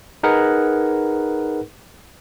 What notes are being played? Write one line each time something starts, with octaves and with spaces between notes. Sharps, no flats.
D#4 G#4 A#4 B4 F#5